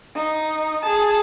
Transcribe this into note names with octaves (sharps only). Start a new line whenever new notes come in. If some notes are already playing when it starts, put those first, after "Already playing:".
D#4
G#4 A5